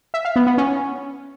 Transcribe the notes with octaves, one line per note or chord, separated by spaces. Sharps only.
E5
F5
B3
B3
C#4